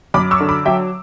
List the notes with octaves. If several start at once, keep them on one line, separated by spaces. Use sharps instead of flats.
F#2 B5 D6
C#6 E6
D3
B5 D6
F#3 E5 G5